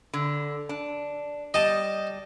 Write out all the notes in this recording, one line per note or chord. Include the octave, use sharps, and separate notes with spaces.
D3
D4
G3 D#5 A5